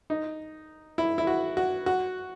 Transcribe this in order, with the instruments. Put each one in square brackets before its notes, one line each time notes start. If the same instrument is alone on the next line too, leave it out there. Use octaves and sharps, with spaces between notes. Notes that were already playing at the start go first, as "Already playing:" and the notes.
[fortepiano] D#4
E4
E4
F#4
F#4
F#4